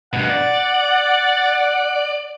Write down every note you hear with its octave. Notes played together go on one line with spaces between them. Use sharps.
G2 B2 F#5
D5